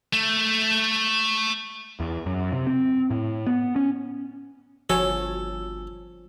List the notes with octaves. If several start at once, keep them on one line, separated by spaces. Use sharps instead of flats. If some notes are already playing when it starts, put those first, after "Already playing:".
A3
E2
F#2
C3
C4
A2
B3
C#4
G1 F3 F#4 A4 C#5 G#5